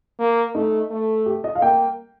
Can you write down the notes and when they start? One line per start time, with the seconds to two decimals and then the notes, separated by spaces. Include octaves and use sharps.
0.19 A#3
0.55 A3 D#4
0.91 A3
1.26 G4
1.44 D#5
1.55 F5
1.62 A#3 G5